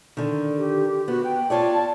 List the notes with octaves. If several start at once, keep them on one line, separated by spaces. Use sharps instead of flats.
D3 D#3
G4
B3 F#4
G5
F4 C#5 D5 A5